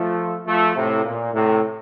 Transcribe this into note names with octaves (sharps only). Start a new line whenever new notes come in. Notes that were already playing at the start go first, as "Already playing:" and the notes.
Already playing: F3 A3
F3 A3
A2 C3
A#2
A2 C3